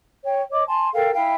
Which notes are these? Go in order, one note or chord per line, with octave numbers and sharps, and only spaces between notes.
C#5 G5
C#5 D#5 D6
G#5 A5 C6
A4 A#4 F5 G5
E4 F5 G5